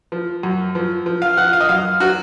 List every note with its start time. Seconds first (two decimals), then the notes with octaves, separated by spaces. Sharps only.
0.12 F3
0.43 F#2
0.75 F3
1.06 F3
1.22 F5
1.37 F3 F#5
1.53 F5
1.60 D#5
1.69 F#2 F5
2.00 F#3 F#4